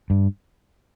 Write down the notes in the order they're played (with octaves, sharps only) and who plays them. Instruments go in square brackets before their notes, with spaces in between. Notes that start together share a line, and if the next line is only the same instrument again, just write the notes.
[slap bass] G2